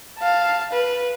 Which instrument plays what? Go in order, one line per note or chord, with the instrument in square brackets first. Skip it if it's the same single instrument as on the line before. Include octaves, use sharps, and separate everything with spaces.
[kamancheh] F5 A5
B4